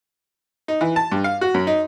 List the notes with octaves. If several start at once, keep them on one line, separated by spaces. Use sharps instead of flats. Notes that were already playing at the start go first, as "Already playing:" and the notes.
D#4
E3
A5
G2
F5
F#4
F#2
D#4